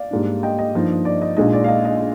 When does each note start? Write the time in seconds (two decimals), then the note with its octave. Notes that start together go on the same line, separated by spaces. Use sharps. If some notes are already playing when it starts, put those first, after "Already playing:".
Already playing: D5 F5
0.11 G#2 G3 A#3 D4
0.43 D#5 G5
0.59 D#5
0.74 G2 F3 A#3 D#4
1.05 D5
1.22 D#5
1.37 A#1 A#2 G#3 D#4 D#5
1.53 D5
1.64 F5
1.68 D#5
1.85 D#5